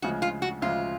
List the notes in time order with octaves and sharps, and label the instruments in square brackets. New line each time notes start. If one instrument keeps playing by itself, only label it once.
[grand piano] D2 C#3 F3 G#3 [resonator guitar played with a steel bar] F#4
[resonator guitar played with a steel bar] F4
F#4
[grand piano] D2 C#3 F3 G#3 [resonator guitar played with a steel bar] F4